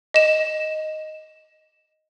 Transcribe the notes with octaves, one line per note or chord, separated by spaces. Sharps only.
D#5 E7